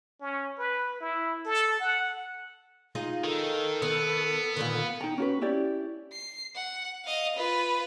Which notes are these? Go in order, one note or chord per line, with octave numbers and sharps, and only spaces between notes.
C#4
B4
E4
A4
F#5
D#4 F4 G#4
D#3 A4
D#3 B3
A#2 D3 D#3
D#4 G5 A#5
C#4 F#4 B4
C#4 E4 G4 D5
C7
F#5
D#5 F5
F4 B4